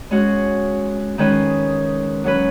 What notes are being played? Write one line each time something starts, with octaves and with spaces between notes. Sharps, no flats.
G#3 C#4 F#4
D#3 G#3 C#4 B4
F#3 C#4 B4